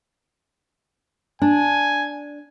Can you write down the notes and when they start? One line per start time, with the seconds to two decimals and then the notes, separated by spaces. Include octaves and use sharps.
1.42 D4 G#5